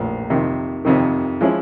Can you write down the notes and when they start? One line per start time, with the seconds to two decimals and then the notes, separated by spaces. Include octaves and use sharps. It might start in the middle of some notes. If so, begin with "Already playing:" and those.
Already playing: A#1 A2 F3
0.30 F2 C3 D#3
0.85 F2 C3 D#3
1.41 F3 G#3 C#4 E4